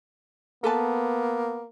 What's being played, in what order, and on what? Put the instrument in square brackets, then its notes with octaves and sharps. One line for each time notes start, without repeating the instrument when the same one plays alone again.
[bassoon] A#3 [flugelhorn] B3 [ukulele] A4 B4 A5